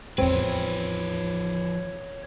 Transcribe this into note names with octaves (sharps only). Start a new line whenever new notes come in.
A1 E2 F3 C4 B4 C#5